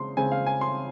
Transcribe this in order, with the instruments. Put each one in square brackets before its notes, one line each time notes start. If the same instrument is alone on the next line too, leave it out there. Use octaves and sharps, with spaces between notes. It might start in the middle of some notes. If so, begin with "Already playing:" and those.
Already playing: [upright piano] C#3 G#3 C4 C6
C#3 G#3 C4 G#5
F5
G#5
C6